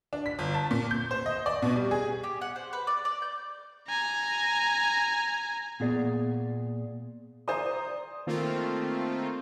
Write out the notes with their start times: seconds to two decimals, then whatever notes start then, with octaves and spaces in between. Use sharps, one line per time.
0.13 D4
0.26 B6
0.39 G1
0.54 A5
0.71 A#2
0.91 G6
1.11 C5
1.26 D#5
1.46 D5
1.62 B2
1.76 G3
1.91 G#4
2.24 G4
2.41 F#5
2.56 C5
2.73 B4
2.87 D5
3.05 D5
3.22 G6
3.88 G#5 A#5
5.80 A#2 B3 G#4 D5
7.48 C5 D5 G#5 A#5 C6 D#6
8.27 D#3 A3 A#3 C4 F4